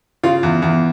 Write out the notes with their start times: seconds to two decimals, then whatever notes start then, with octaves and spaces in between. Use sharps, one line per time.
0.23 C#3 F4
0.43 E2
0.62 E2